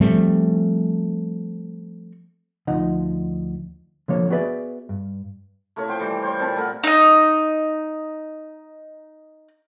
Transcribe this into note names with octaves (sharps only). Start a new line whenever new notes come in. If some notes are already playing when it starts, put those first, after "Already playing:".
F3 G3 A3 C4
D2 F3 D#4 D#5 F#5
D3 F3 A#3 C#5
B3 F#4 G#4 B4 D5 E5
G2
A3 A#3 E4 C#5
F3 C5 G5 C6
E3 G3
C5 C#5 C#6
A#2 C4 A5 B5
A3 A#4 F#5
D#4 D#5